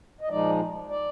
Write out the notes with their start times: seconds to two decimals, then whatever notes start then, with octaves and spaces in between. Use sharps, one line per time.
0.21 D#5
0.29 A#2 F3 G#3 D#4 D5
0.89 D5